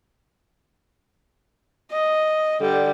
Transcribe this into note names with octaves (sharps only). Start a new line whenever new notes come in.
D#5
D3 G3